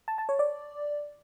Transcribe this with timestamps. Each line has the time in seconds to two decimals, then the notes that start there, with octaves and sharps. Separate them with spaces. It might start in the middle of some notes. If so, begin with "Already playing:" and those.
0.08 A5
0.18 A5
0.29 C#5
0.39 D5